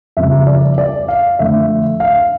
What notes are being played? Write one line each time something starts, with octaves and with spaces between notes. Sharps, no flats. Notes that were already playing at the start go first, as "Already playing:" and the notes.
F2 C#3 G3 E5
D5
D5
F5
F2 D3 A3 E5
F5